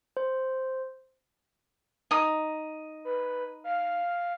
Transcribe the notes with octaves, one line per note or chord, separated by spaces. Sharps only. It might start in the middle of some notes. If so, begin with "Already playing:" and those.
C5
D#4 D#6
B4
F5